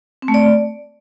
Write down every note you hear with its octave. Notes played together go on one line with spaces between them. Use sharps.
C4
A3
D5